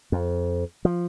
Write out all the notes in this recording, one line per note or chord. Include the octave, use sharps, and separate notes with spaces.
F2
F3